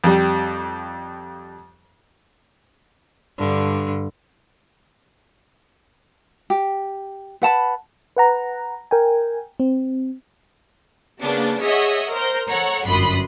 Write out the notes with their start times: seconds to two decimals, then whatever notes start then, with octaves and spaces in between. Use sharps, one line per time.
0.04 F2 G3
3.38 G2 D3
6.50 G4
7.42 B4 F#5 A5 B5
8.17 B4 F#5 A#5
8.91 A#4 G5 G#5
9.60 C4
11.21 C#3 A#3 B3 D4
11.62 G#4 C#5 D#5 E5 F#5
12.13 A#4 C5 A#5 G6
12.49 A4 C#5 F#5 A#5
12.86 G1 F#2 D4 B5 C6 D#6